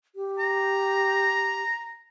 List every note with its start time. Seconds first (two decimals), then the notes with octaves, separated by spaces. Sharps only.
0.15 G4
0.39 A#5